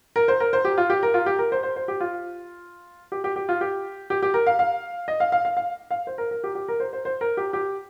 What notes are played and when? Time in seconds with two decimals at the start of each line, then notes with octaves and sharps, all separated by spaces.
0.16 A#4
0.28 C5
0.40 A#4
0.53 C5
0.65 G4
0.78 F4
0.90 G4
1.03 A#4
1.14 F4
1.26 G4
1.39 A#4
1.52 C5
1.63 C5
1.76 C5
1.88 G4
2.01 F4
3.12 G4
3.24 G4
3.36 G4
3.49 F4
3.61 G4
4.10 G4
4.22 G4
4.34 A#4
4.47 F5
4.59 F5
5.08 D#5
5.20 F5
5.32 F5
5.45 F5
5.57 F5
5.91 F5
6.07 C5
6.18 A#4
6.31 A#4
6.44 G4
6.55 G4
6.68 A#4
6.80 C5
6.93 C5
7.05 C5
7.21 A#4
7.37 G4
7.53 G4